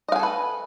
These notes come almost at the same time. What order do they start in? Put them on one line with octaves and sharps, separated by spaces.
D#5 F5 G#5 A4 B4